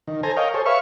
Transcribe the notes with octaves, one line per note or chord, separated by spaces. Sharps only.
D#3
A4 C5 G#5 A#5
A#4 C#5 D#5 F5 G5
G#4 A4 C5 C#5
B4 C#5 E5 F5 C#6